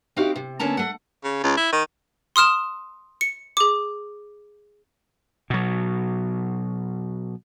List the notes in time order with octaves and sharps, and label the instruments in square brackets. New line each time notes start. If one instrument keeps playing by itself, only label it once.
[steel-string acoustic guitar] C4 D#4 E4 F#4 G4 F5
C3
D3 A#3 B3 C#4 A5 A#5
A3 F#5
[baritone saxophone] C#3
C#2
E4
D#3
[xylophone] C6 D#6 F6 E7
C#7
G#4 D6
[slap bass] B2 F#3